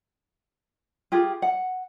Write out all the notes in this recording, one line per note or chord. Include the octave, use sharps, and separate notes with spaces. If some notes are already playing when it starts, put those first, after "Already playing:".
F4 G4 G#4
F#5